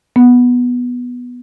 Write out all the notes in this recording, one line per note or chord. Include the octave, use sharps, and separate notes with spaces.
B3